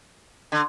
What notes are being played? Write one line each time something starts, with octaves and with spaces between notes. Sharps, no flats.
D3